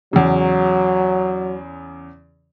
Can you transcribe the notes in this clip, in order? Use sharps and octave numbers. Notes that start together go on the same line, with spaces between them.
E2 C#3 F#3